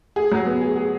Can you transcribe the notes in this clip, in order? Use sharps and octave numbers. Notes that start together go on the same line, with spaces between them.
G#4
F#3
B3
G#4
G#4